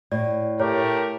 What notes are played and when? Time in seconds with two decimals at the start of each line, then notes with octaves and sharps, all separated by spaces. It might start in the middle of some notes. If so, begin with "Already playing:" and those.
0.12 A2 D5
0.60 A3 G4 A#4 C#5